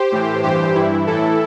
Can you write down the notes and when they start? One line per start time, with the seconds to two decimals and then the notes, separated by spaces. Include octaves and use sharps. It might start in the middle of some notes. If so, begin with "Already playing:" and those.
Already playing: G4 C5
0.12 A2 E3
0.43 G2 E3 G4 C5
0.75 G2 E3 E4
1.07 A2 E3 E4 A4